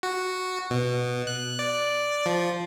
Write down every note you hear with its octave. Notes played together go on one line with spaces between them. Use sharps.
F#4
B2
F#6
D5
F3